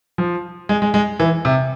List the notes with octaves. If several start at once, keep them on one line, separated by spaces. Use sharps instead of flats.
F3
G#3
G#3
G#3
E3
C3